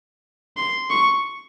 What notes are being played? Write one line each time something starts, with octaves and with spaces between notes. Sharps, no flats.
C6
C#6